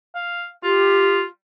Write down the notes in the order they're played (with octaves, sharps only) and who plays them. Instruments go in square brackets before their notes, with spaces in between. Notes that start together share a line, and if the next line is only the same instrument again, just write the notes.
[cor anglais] F5
[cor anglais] F4 [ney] G4